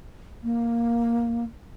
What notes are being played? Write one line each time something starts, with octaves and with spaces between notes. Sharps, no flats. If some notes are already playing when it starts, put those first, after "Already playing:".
A#3